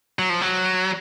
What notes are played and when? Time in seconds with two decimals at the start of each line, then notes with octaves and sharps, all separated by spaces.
0.19 F#3
0.29 F3
0.41 F#3